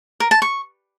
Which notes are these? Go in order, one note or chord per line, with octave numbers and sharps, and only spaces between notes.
A#4
A5
C#6